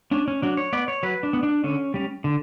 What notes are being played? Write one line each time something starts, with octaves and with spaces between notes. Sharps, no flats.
C#4 D4
C#4
F#3 D4
C#5
B3 D5
C#5
F#3 B4
D4
B3
D4
D3 C#4
G3 C#4
D3